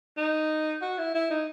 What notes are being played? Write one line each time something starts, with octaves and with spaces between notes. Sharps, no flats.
D#4
F#4
E4
E4
D#4